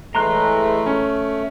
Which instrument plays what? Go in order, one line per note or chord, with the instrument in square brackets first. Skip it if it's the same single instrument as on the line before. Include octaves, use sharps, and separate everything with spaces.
[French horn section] A2 E3 G#3 [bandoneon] A3 [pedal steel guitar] A#5 C6 F#6
[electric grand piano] C#4